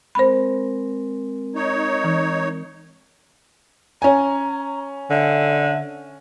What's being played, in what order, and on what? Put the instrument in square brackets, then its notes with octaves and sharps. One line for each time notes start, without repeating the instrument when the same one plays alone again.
[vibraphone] G#3 C4 A#4 [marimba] C5 B5
[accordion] D#4 C#5
[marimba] E3
[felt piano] C#4 G#5 [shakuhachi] A#5
[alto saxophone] D3 [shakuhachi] E5